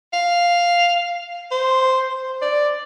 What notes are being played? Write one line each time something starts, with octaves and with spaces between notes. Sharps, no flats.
F5
C5
D5